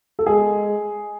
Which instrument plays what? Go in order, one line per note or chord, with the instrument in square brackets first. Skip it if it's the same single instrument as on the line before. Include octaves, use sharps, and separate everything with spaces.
[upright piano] A4
[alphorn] G#3 [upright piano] G#4